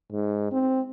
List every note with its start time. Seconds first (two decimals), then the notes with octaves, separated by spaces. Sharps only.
0.13 G#2
0.52 C4